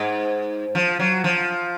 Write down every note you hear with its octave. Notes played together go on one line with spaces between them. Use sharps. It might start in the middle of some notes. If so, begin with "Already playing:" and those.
Already playing: G#2
F3
F#3
F3